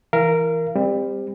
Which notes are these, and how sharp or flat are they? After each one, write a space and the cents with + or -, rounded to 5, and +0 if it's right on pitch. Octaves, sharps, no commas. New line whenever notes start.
E3 +0 A#4 +0 F5 -40
G3 +25 C4 -10